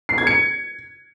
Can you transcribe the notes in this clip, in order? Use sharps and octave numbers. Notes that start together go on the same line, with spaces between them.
C7
G#6
C#7